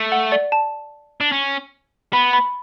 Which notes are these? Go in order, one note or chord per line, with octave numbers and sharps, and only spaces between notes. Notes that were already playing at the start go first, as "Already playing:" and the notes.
Already playing: A3
F#5
D5
A5
D4
C#4
B3 B5
B5